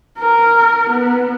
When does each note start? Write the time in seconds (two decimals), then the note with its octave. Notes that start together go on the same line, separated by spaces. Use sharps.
0.19 A#4
0.90 B3